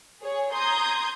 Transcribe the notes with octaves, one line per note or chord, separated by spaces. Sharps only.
G#4 C#5
A#5 C6 D#6 G6 G#6